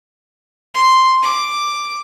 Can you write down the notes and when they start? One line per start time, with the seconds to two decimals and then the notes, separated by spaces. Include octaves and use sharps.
0.74 C6
1.23 D6